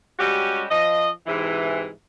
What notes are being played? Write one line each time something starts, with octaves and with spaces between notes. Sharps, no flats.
G3 G#3 C#4 F#4 G4
F3 D#5
G#2 C3 E3